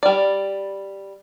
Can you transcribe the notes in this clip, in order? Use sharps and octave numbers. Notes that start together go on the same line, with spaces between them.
G3 D5